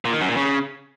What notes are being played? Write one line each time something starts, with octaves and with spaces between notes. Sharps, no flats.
A#2
D#3
F#2
A#2
C#3